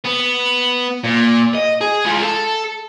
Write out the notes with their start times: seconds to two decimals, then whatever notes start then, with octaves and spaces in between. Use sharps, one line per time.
0.05 B3
1.04 A#2
1.55 D#5
1.81 G#4
2.05 G#3 F4
2.22 A4